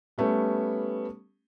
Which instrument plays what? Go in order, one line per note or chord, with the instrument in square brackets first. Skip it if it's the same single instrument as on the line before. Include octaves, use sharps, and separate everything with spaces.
[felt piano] G3 A3 B3 C#4